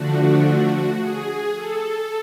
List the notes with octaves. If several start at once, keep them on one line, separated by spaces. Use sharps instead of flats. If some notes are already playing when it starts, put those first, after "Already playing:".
Already playing: D3 F3 A3 D4 F#4
F#4
G#4
A4